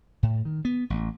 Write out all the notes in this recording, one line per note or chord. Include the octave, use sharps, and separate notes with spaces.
A2
D#3
B3
A1